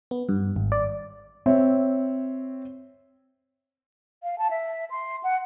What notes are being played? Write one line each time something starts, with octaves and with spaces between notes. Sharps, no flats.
B3
G2
G#1
D5
C4 C#5 E5
F5
A5
E5
C6
F#5